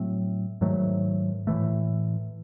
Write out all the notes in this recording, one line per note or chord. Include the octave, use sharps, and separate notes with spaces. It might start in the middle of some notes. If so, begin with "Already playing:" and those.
Already playing: A2 F#3 A3 C4
G#2 D#3 F#3 A3
A2 E3 A3